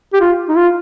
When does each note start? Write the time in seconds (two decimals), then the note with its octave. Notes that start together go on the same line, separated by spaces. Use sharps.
0.13 G4
0.20 F4
0.48 D#4
0.56 F4